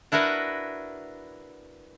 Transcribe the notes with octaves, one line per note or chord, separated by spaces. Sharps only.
D4 E4 F#4 A#4 B4